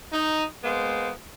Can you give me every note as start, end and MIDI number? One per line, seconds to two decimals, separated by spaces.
0.12 0.44 63
0.63 1.10 56
0.63 1.10 58
0.63 1.10 59
0.63 1.10 72